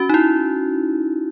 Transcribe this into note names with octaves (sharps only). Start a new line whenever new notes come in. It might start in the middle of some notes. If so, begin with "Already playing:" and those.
Already playing: C#4 F#4
D#4
E4